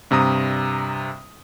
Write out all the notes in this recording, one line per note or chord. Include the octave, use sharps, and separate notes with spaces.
G2 C3 G3 A#5 D#6